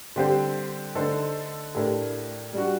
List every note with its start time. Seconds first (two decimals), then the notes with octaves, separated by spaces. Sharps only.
0.16 D3 G3 C4 G4 C5
0.95 D3 A3 D#4 A4 C5
1.74 A2 A3 D4 G4 A#4
2.53 G3 D4 F#4